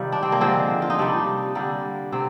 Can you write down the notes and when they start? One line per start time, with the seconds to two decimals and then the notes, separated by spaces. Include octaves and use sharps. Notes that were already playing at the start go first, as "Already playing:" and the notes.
Already playing: C3 D#3 G3 F4
0.12 D4
0.23 C4
0.32 A#3
0.41 D3 F3 G#3 C4
0.82 F4
0.90 D#4
0.98 C3 G3 D4
1.55 D3 G3 A#3
2.12 C3 C4